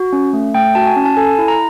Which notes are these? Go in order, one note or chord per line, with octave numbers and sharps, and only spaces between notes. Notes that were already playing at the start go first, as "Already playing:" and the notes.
Already playing: F#4
C#4
A3
A3 G5
F#4 A5
G#5
C#4
A5
A4 G#5
E4
A#5